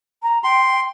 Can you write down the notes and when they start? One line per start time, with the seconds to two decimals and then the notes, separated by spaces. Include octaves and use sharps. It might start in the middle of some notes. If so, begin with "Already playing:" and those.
0.23 A#5
0.44 G5 C6